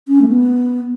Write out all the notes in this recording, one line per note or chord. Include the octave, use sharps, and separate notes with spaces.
C#4
A3
B3